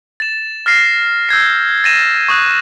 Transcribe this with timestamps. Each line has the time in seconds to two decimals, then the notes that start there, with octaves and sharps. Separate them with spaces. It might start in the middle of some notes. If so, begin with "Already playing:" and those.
0.20 A6 E7
0.66 F6 A6 A#6 C7
1.29 E6 G6 G#6 C7
1.84 A6 A#6 D#7 E7
2.28 C#6 D#6 F#6